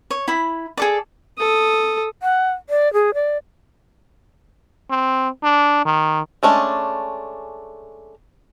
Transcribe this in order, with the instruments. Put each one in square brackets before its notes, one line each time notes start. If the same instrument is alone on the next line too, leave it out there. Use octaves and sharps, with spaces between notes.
[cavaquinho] C#5
E4 B5
G#4 A4 D5
[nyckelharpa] A4 D#6
[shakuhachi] F#5
D5
G#4
D5
[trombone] C4
D4
D#3
[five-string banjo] G#3 A3 C#4 D4